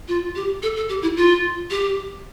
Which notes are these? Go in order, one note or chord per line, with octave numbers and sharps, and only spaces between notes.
F4
G4
A4
A4
G4
E4
F4
G4